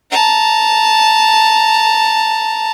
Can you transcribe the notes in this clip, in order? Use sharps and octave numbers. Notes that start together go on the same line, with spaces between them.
A5 A#5